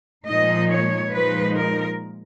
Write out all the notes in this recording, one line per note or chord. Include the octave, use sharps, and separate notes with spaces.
A#2 F3 G#3 D#4 D#5
C#5
A#2 F3 G#3 D#4 B4
A#4